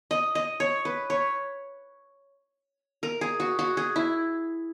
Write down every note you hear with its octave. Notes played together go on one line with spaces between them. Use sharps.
D#5
D#5
C#5
B4
C#5
A#4
G#4
F#4
F#4
G#4
E4